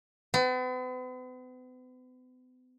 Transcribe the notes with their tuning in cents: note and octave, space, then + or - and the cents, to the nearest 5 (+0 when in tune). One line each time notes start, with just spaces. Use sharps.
B3 +45